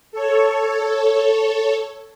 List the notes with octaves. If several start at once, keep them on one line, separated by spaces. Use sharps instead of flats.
A4 C#5